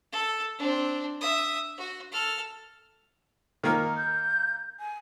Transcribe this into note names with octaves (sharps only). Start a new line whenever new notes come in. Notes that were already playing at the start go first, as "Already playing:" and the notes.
A4
C4 D4
E5 D#6
F#4
A4 F6
D#3 A#3
G6
G#5